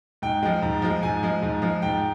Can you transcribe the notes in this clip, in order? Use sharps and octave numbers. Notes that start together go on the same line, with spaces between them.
G#2 G5
F3 G#3
G#2
F3 G#3
G#2 G#5
F3 G#3
G#2
F3 G#3
G#2 G5